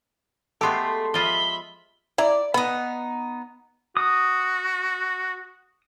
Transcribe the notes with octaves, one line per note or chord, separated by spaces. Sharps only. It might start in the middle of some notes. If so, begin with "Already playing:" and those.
G#3 A3 B3 G4 A4 C6
F3 F4 D#5 E5 B5 G7
E4 D5 A#5
B3 D#4 B5
F#4 D#6